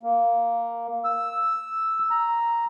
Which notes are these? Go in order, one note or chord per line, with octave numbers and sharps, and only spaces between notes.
A#3
E6
A#5